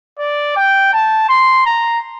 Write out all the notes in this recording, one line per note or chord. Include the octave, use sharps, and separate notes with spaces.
D5
G5
A5
C6
A#5